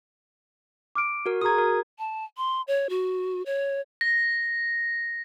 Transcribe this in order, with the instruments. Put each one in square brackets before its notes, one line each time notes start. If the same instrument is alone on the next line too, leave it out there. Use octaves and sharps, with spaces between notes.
[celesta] D6 F6 D7
[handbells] F#4 A#4
[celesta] F#4 G#4 A#5 [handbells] D#6 G#6
[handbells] A#4
[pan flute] A5
C6
C#5
F#4
C#5
[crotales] A#6